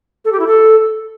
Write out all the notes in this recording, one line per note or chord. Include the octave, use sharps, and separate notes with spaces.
A4
G4
E4
A4